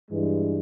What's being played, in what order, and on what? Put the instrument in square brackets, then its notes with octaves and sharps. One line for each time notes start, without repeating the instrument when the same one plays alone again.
[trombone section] G2 E3 G#3